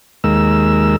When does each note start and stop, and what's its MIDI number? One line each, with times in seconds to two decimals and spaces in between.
0.24 0.96 39
0.24 0.96 56
0.24 0.96 70
0.24 0.96 88